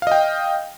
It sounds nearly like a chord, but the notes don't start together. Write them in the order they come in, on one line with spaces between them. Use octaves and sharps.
F5 D#5 G5